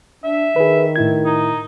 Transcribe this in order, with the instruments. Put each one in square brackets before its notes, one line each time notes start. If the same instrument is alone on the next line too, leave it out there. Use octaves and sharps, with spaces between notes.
[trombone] D4 [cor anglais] E5
[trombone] D#3 [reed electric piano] G#4 B4
[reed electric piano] A2 E4 G#6
[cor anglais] D#4